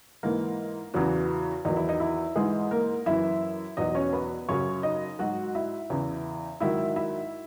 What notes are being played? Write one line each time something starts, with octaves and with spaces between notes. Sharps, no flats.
G#2 E3 A#3 A#4
E2 C#3 E3 F#3 F#4
E2 D#3 F#3 D#4
E4
D#4
E4
G#2 E3 G#3 G#4
A#3 A#4
F#2 E3 E4 E5
E2 B2 F#3 D#4 D#5
C#4 C#5
B3 B4
F#2 C#3 F#3 C#4 C#5
D#4 D#5
G#2 F#3 F#4 F#5
E4 E5
E2 C#3 E3
G#2 D#3 F#3 E4 E5
E4 E5